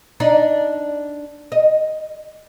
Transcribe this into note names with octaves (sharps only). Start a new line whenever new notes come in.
D4 D#4
D#5